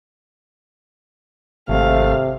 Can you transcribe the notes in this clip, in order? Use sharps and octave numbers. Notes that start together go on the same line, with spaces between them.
G#1 C3 A3 F5